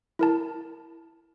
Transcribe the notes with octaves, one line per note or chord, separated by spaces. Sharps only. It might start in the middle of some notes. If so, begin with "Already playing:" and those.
E4 A#4 A5